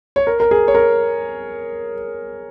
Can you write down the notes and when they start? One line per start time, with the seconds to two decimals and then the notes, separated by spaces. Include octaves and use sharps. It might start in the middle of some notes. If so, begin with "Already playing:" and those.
0.16 C#5
0.27 A#4
0.40 A#4
0.51 G#4
0.68 C#5
0.75 A#4